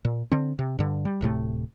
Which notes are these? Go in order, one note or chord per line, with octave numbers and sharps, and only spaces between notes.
A#2
D3 C4
C3
G2 D3
G3
D1 A2 C3 A3